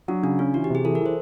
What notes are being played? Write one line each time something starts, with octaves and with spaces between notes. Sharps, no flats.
F#3 D4
C#3 D4
C#4 F4
E3 F#4
G4
C3 G#4
E3 A4
A#4
E3 C5